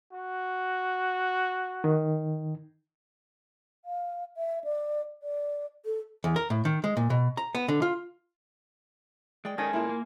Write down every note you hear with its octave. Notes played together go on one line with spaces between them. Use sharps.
F#4
D#3
F5
E5
D5
D5
A4
E2
A#4
A2
D#3
G#3
A#2
B2
A#5
B3
D3
F4
G#3 D5 G5
D#3 G#3 C#4 A4 G#5
A#2 E4 A#4
A#3